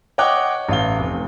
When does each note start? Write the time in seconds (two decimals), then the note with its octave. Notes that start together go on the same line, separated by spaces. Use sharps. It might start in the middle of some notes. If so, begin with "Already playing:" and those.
0.18 C#5 D#5 F#5 G5 D6 F#6
0.69 A1 F5 G7
0.99 F1